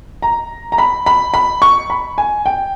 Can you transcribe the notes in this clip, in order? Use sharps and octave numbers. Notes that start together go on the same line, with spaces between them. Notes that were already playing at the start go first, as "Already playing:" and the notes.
A#5
A#5
B5
B5
B5
C#6
B5
G#5
G5